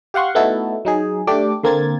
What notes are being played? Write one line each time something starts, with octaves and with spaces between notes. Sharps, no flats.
G4 F5 F#5 C6 C#6
A3 B3 D#4 E4 F#4 A4
F#3 D#4 G#4
A3 D4 G4 D6
D3 A#3 C4 G#6 A6